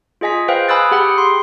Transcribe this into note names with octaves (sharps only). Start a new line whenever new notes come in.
F4 G#4 D#5 G#5 B6
B4 C5 D#5 F5 G5 G#5
G#5 B5 D#6 E6 F#6 A6
G4 G#4 F#5 G5 B5 D#6
C6